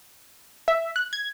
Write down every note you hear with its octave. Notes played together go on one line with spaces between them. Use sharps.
E5
F#6
G#6